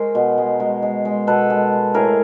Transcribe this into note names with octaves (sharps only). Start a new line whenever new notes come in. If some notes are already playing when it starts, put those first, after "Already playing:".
Already playing: G#3 A#4 C5
B2
G#3
G#3
G#3
G#3
B2 A4 B4
G#3
G#3
A2 G#4 A#4